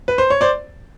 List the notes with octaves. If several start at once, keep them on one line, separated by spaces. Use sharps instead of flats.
B4
C5
C#5
C5 D5